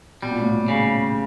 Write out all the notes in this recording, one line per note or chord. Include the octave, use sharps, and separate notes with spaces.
B2 G3
A#2
A2
A#2
C#3